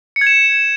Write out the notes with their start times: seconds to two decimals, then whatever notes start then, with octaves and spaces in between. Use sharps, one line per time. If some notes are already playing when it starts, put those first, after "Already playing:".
0.16 C#7
0.21 G#6
0.27 E7